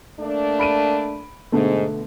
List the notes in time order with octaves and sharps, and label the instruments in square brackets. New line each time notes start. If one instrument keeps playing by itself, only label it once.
[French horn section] A3 A#3 D4
[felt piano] B5 D7 D#7
[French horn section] G#2 [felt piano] B2 D3 A3